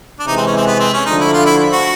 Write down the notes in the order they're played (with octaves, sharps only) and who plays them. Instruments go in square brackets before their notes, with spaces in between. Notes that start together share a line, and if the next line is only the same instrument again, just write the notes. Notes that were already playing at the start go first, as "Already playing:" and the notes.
[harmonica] D4
[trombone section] C3 E3 G#3 [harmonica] D#4
[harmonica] C4
C#4
C4
B3
C4
C#4
[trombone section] D3 F3 A3 D4 [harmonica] D#4
[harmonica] E4
F4
E4
F#4